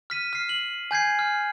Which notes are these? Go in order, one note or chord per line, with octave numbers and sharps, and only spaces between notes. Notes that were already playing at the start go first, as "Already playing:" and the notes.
F6 B6 D#7
F6 C7
F#7
G#5 G6 G#6 C7
F6